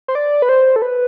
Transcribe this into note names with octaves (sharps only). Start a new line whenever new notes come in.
C5
D5
B4
C5
A4
B4